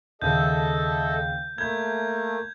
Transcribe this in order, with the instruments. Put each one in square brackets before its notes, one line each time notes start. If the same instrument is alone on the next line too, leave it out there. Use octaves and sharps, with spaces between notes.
[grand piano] D#2 C#3 [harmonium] A4 D#5 E5 [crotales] G6
[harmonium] A3 A#3 [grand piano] B5 G6 [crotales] G#6